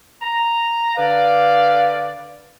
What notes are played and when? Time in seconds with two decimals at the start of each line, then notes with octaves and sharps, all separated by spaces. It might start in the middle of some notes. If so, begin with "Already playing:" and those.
0.22 A#5
0.97 D3 B4 D5 F5